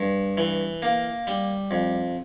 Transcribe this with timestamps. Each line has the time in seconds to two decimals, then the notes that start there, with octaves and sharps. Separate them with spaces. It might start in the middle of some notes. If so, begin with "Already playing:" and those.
Already playing: G2
0.37 E3
0.82 A#3
1.27 G3
1.71 F2